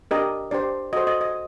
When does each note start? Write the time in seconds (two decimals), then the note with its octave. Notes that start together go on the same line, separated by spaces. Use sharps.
0.11 D4 G4 A#4 D#5
0.51 D4 G4 C5 D5
0.93 F#4 A4 C5 D#5
1.07 D#5
1.21 D#5